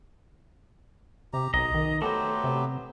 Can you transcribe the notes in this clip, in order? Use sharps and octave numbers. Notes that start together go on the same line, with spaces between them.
C3 G4 A#5
B1 D#5 A#5
D#3
F#3 A3 B3 G4 A4 C5
C3